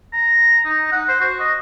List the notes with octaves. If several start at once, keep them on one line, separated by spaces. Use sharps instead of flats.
A#5
D#4
F#5
C5
F#4
D#5